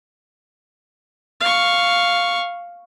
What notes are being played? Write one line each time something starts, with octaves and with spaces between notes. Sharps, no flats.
F5 C#6